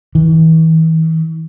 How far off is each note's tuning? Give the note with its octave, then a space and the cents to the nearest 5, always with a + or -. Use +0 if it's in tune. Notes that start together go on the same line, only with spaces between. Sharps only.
E3 -40